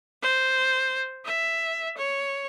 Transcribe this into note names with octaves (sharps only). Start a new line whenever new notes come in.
C5
E5
C#5